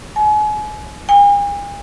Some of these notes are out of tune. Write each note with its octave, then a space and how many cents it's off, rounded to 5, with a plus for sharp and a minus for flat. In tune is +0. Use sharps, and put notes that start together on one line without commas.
G#5 +35
G#5 -45